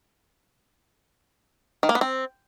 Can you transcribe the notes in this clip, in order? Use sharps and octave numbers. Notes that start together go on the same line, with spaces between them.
D#3
A#3
B3
C4